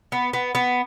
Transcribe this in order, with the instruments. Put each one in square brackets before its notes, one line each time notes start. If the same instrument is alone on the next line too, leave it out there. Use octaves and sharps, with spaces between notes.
[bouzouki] B3
B3
B3